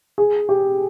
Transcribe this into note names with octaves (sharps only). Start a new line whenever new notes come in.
G#4
G4